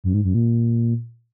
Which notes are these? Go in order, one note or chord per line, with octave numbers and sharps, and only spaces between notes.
F#2
G#2
F#2
A#2